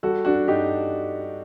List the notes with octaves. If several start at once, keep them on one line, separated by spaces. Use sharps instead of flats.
G3 F#4 A4
D4 F#4
G2 D#4 G4